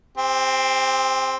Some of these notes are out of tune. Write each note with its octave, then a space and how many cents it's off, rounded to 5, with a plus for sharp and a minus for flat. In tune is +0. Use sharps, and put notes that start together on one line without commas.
C4 +0 G4 +40